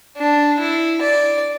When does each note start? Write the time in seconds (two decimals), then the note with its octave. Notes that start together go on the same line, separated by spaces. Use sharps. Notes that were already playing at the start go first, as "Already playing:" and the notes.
0.17 D4
0.60 E4
1.02 D5